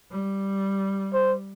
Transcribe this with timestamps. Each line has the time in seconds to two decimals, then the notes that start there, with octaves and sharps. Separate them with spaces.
0.11 G3
1.14 C5